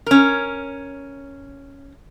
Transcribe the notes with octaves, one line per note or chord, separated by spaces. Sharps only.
C#4 A#4